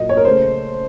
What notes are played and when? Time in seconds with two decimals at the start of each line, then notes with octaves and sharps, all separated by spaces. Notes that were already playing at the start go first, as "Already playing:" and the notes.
Already playing: A#2 F#3 A#3 D#5
0.09 C#5
0.17 A#4
0.25 C#3 A3 C5